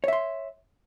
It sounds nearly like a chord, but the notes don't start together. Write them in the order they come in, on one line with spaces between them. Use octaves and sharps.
C#5 E5 C6